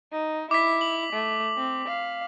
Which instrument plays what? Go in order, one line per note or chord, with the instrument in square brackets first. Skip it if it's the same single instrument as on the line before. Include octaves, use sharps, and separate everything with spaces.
[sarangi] D#4
[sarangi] E4 [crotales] D6 B6
[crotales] F#7
[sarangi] A3
C4
F5